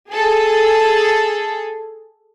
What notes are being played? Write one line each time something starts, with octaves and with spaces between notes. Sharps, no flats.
G#4 A4